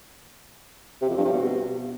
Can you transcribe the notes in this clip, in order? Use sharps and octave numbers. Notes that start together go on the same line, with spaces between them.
C3
F2
G2
C3
B2